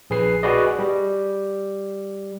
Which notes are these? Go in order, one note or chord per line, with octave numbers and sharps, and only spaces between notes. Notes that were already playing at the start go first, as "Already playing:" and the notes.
A#1 G#4 B4 C7
F#4 G#4 B4 D5 D#5
G3